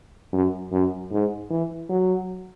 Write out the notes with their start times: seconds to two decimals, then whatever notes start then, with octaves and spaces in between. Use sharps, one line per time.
0.33 F#2
0.72 F#2
1.12 G#2
1.50 E3
1.89 F#3